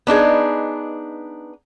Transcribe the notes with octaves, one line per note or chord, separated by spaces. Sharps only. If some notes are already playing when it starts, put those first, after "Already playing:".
B3 D4 D#4 G#4